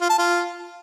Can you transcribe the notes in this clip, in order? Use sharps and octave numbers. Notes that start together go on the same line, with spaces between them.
F4
A5
F4